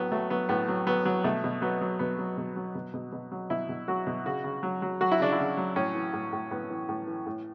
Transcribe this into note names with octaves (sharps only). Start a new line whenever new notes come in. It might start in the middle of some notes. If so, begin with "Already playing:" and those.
Already playing: A2 F#3 B3
F#3 A3
F#3 B3
A2 B3
F#3
F#3 B3
F#3
B2 A3
B2
F#3 B3
F#3
B2 B3
F#3
B2
F#3
B2
B2
B2
F#3
B2 E4
B2
F#3 F#4
B2
C#3 F#4
C#3
F#3
F#3
F#3 F#4
E4
C#3 D4
E4
C#3
F#3
A2 C#4
E3
A2
A2
A2 B3
E3
A2
E3
A2